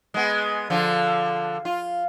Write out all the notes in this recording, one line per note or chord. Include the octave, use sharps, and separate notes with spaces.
G#3 B3
D3 F3 F4
F4